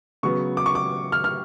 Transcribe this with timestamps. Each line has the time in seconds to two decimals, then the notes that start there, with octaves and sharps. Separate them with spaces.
0.23 C#3 F#3 B3 C#6
0.57 D6
0.66 C#6
0.75 D6
1.12 F6
1.24 F6